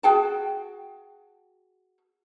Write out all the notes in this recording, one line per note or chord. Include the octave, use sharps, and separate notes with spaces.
F#4 G#4 G5 A5